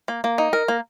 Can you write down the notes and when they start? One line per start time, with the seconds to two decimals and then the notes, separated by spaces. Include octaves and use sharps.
0.08 A#3
0.24 A#3
0.38 D#4
0.53 A#4
0.68 A#3